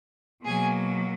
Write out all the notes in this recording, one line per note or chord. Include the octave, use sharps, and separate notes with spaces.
B2 F#3 A#3 G#4 G#5